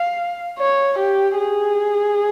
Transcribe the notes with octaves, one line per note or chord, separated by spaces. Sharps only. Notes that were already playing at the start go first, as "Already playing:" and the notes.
Already playing: F5
C#5
G4
G#4